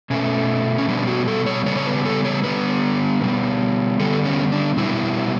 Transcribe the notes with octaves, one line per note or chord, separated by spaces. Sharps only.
B2 A3 C#4
C#4
B2 G3 B3 D4
F#4
A4
C#5
C#3 G3 B3 C#5
C#5
B4
A4
C#5
D3 G3 B3 B4
B2 G3 B3
D3 G3 B3 A4
C#4
D4
B2 G3 B3 E4